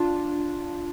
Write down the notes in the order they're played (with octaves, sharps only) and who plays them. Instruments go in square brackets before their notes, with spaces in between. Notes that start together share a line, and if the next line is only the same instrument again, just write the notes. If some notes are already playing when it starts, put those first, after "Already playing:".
Already playing: [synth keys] D4 F4